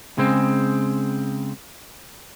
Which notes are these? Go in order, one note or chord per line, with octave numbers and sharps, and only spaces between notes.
C#3 G#3 C4